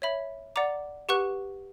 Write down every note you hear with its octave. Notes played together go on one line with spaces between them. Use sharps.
C#5 E5 B5
D5 F#5 A#5 D6
G4 B4 F#5 C#6 F#6